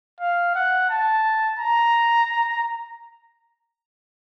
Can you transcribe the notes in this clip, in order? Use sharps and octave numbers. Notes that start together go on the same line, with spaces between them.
F5
F#5
A5
A#5